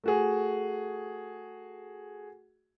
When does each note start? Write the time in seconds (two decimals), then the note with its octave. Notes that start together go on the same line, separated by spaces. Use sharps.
0.04 A3 F#4 G#4